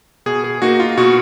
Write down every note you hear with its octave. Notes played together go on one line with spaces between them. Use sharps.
B2 G#4
G#4
A#3 D#4 F#4
F4
B2 F#4